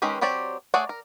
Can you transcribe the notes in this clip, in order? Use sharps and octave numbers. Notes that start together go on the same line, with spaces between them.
D#3 G#3 C#4 G4 B4
F#3 C4 G4 C#5 D5
A3 G#4 C#5 D5 F#5
A#4